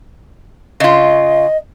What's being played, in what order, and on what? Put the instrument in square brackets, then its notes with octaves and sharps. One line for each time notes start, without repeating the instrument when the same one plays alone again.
[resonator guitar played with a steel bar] C#3 F4 [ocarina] D#5